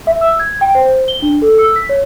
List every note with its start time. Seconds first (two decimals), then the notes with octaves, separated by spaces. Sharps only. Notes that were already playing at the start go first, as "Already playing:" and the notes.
0.07 E5
0.21 E6
0.39 G#6
0.61 G5
0.75 C5
1.08 G7
1.22 D4
1.42 A4
1.58 E6
1.76 B6
1.89 C#5